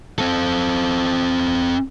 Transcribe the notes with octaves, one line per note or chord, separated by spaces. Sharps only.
C4 A4